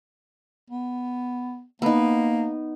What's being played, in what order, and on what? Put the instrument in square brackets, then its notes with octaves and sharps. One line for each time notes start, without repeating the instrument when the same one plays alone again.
[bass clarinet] B3
[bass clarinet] A#3 [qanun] B3 D#4